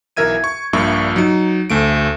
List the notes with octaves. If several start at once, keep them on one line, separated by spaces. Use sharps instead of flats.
B1 E3 A#4 E5 G#6 D#7
C#6
A#1 G2 A#2 G3 E5 C#6
F#3 D#4 C#7
D2 A3 D7